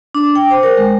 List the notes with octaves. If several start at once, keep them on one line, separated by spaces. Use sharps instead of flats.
D4
G5
C5
A#4
G#3